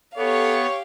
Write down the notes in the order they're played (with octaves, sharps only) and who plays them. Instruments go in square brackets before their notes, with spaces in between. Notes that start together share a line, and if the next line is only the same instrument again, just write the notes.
[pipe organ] B3 [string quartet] G4 F5 [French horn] A4 [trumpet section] C#5